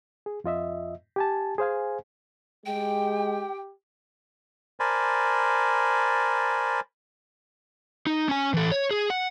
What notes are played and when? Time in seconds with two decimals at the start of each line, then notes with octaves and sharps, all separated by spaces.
0.26 G#4
0.44 F2 F4 D#5 E5
1.16 G4 G#5 A5
1.58 G#4 C5 F5 G#5
2.66 G#3 G4 G5
4.80 A#4 C5 D5 G#5 A5 B5
8.07 D#4
8.29 C#4 G#5
8.54 E3 A4
8.71 C#5
8.91 G#4
9.10 F#5